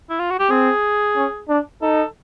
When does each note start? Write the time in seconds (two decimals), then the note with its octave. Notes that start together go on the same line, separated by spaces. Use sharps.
0.10 E4
0.20 F4
0.30 F#4
0.40 G4
0.50 C4 G#4
1.16 C#4
1.49 D4
1.82 D#4 A4